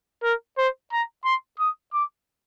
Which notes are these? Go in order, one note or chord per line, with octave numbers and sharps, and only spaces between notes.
A#4
C5
A#5
C6
D#6
D6